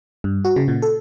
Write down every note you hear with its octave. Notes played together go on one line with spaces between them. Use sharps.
G2
F#4
C#3
A#2
A4